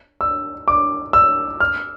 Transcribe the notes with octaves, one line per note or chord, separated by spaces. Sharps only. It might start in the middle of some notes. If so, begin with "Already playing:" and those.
E6
D6
E6
F6